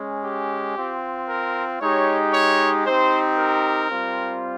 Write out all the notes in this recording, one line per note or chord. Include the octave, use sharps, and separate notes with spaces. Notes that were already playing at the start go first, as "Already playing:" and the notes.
Already playing: G#3 C#4
G4
C4 F4
A#4
G#3 D#4 G4 C#5
C#5
C4 D#4 G4 C5
A#4
G3 C4 F4